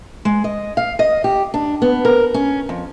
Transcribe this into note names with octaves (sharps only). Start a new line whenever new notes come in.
G#3
D#5
F5
D#5
G4
D4
B3
A#4
C#4
F2